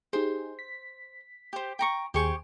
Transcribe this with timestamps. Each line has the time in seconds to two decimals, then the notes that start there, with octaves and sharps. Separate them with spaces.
0.13 D#4 G4 G#4 C5
0.59 B6
1.53 G4 C5
1.79 G5 A#5 C#6
2.14 D#2 G4 G#4 C5 G#5 C#6